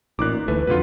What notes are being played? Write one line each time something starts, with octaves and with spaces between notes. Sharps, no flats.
A1 A#2 D#4 D6 F#6
D2 E3 A3 B4
B1 F2 D3 F#3 F4 B4